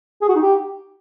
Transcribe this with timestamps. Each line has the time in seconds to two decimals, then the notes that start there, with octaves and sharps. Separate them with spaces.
0.22 G#4
0.29 F#4
0.35 D#4
0.42 G4